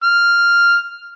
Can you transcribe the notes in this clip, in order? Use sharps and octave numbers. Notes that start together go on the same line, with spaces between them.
F6